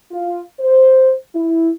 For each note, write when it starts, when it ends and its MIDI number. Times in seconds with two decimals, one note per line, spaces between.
0.11 0.42 65
0.60 1.13 72
1.35 1.70 64